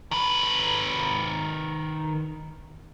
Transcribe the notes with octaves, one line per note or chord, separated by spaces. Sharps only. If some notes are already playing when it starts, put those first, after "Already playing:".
D#3 B4